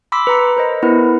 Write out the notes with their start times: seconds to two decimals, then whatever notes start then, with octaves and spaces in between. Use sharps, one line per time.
0.12 B5 C6 D6 E6 B6
0.27 B4 A#5 C#7
0.57 A#4 C5 D#5
0.82 B3 E4 A#4 B4